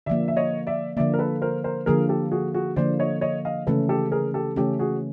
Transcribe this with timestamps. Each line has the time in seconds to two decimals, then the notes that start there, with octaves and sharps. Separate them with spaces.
0.06 D3 F3 A#3 D5 E5
0.28 E5
0.37 C#5 D#5
0.67 D5 E5
0.97 D3 F3 A#3 D5 E5
1.14 A#4
1.19 A4 B4
1.42 A#4 C5
1.64 A#4 C5
1.86 D3 F3 A#3 G#4 A#4
2.09 G4 A4
2.32 F#4 G#4
2.54 F#4 G#4
2.76 D3 F3 A#3 C5 D5
2.99 C#5 D#5
3.21 C#5 D#5
3.45 D#5 F5
3.67 C#3 E3 A3 C#4 A4 B4
3.89 G4 A4
4.12 G#4 A#4
4.34 G4 A4
4.56 C#3 E3 A3 C#4 G4 A4
4.79 F#4 G#4